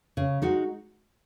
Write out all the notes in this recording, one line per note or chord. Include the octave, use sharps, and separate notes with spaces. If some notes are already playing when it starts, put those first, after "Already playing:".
C#3
G#3 D#4 F#4